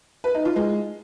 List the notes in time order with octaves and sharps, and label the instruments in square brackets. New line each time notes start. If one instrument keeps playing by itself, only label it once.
[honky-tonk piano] B4
D#4
F4
G#3